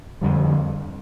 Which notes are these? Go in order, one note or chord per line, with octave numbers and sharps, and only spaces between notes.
F2 D3 G3